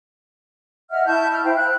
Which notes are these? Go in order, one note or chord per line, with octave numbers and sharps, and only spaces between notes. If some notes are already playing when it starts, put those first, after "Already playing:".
D#5 E5 F#5 F6
E4 A5 C#6 G6
F6
E4 C5 F5 G5
F#6